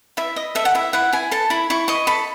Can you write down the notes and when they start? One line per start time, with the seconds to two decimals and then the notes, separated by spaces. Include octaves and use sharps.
0.17 E4 E5
0.36 D#5
0.55 A4 E5
0.65 F#5
0.75 E4 E5
0.93 E4 F#5
1.13 E4 G#5
1.31 A4 A5
1.50 E4 B5
1.70 E4 C#6
1.88 D#5 C#6
2.07 A4 B5